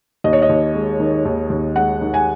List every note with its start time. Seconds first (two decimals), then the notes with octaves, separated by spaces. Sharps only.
0.24 D#2 D#5
0.33 C#5
0.42 D#5
0.49 D#2
0.75 G#3
1.00 D#3
1.25 D#2
1.50 D#2
1.76 G#3 F#5
2.01 D#3
2.14 G#5